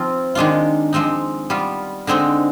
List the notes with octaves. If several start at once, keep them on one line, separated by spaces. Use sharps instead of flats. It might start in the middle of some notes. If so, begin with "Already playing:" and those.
Already playing: F3 C4 F4
D#3 G#3 D4 F4
F3 G#3 C4 D#4
G3 B3 F4
D3 G#3 C4 D#4